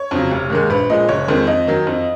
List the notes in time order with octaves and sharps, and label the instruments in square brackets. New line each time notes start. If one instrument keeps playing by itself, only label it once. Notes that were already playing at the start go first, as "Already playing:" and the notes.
Already playing: [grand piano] C#5
F2 C#3 F#3
F1
D#2 D#3 G#3
A#1 B4
A#2 F3 G#3 D#5
F#1 C#5
F2 D#3 G#3
F2 D#5
D#3 F#3
F2